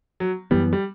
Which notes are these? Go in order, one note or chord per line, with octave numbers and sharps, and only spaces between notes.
F#3
F#2 E3 G3 B3
G3